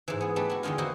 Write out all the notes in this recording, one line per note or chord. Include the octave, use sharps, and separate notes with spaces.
G#2 E3
B3 G#4
G3 A3 D4 B4
E4 F#4
E2 D3 D#3 G#3 F4
A#3 D#4 E4 F#4 C5